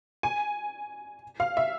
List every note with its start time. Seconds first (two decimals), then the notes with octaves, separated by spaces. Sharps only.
0.23 G#5
1.40 F5
1.57 E5